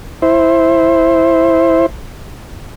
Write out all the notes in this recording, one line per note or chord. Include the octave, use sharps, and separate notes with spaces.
E4 C5